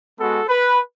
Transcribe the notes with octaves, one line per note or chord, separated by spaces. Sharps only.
G#3 B3 F#4 A4
B4